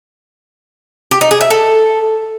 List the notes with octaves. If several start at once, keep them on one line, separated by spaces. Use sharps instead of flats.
G4
D#4
G#4
E5
A4